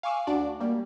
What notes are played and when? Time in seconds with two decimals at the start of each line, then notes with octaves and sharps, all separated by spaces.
0.03 F5 G#5 C#6 D6 E6 F#6
0.27 D2 D4 F#4 D5
0.60 G3 A#3